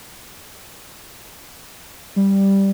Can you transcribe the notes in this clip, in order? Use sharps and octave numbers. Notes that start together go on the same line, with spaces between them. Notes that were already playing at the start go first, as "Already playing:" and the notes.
G3